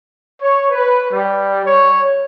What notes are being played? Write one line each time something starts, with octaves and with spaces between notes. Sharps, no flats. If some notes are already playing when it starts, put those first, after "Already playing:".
C#5
B4
G3
C#5